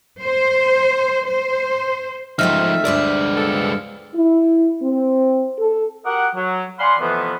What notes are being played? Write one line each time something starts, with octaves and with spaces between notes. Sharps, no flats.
C5
C5
G#2 F3 A3 C4 D#4 E5 F6
D2 G2 G#3 B4 D5
F3 B3 A4
E4
C4
A4
F#4 G4 A#4 D#5 F#5
F#3
D5 F5 F#5 G#5 B5 C6
F2 C3 E3 F3 A3 B3